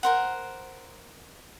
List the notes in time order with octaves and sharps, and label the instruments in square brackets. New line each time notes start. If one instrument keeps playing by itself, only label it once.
[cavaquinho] A#4 C5 F#5